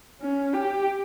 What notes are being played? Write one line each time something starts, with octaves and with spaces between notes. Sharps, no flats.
C#4
G4